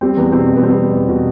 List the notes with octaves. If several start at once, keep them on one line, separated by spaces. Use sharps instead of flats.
G3 C4
E2 B3
B2 C4
E2
B3
G3 C4
B2
E2
B2